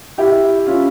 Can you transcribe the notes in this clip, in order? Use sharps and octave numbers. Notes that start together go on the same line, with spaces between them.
E4 G4
C#4 F4